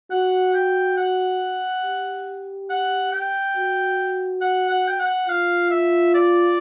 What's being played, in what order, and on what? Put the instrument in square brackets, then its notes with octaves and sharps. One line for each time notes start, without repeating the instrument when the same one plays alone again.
[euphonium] F#4 [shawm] F#5
[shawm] G5
F#5
[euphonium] G4
[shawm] F#5
G5
[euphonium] F#4
[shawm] F#5
F#5
G5
F#5
[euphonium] F4 [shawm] F5
[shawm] E5
D5